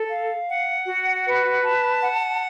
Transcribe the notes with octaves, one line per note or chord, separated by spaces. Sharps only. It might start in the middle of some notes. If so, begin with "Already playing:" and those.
Already playing: A4
F5
F#5
F#4
B4
A5
F#5